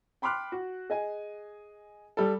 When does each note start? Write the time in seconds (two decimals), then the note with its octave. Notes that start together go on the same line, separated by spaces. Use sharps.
0.22 G5 B5 C6 D6 F6 F#6
0.52 F#4
0.90 G#4 D#5 G#5
2.17 G3 A4